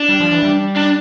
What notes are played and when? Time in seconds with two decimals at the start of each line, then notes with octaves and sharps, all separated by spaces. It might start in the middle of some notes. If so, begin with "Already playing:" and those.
Already playing: D4
0.09 G3
0.20 F3
0.32 E3
0.43 G3
0.76 D4